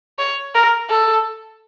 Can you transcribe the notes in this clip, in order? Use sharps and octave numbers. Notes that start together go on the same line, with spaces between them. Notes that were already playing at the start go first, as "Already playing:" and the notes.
C#5
A#4
A4